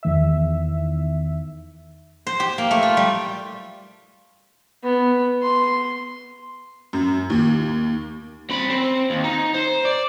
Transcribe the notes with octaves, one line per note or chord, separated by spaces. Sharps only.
E2 D#3 E5
C5
G4
A#3
A3
F4
G3
B3
C6
F#2
D#2
C4 B5
C4
D#2
D#4
C5
D5